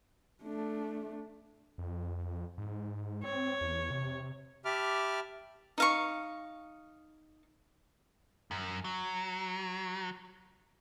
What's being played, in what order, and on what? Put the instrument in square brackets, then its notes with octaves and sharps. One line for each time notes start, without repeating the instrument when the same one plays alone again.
[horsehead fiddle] A3 D4
[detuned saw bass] F2
G#2
[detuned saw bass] C4 [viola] C#5
[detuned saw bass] E2
C3
[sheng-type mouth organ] G4 E5 A5 B5 D6 F6
[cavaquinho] D#4 F5 C#6
[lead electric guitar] F#2
F#3